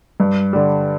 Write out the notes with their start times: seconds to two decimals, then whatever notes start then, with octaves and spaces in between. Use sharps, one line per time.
0.20 G2
0.53 D3 G3